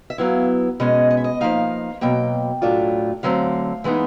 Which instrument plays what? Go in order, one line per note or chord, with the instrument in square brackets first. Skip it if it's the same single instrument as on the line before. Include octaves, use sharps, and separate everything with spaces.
[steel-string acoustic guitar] E5
F#3 B3 E4 F5
B2 G#3 C#4 D#5
D#5
E5
D#5
F3 A#3 D#4 F5
B2 F#3 A#3 G5
A2 F#3 A3 D4 F4
D3 F#3 A3 C4 F5
E3 G#3 B3 D#4